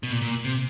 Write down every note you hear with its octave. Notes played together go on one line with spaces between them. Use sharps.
B2
A#2
A#2
C3